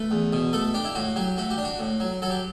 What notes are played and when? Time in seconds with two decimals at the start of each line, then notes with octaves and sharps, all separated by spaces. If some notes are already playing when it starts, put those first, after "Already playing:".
Already playing: A3 B4
0.11 E2
0.33 B2
0.53 A3 A4
0.74 D4 G4
0.85 E4
0.95 A2 F#4
1.16 F#3 G4
1.37 A3 F#4
1.50 G4
1.58 D4
1.64 F#4
1.79 A2
2.00 F#3
2.22 F#3 A4
2.30 G4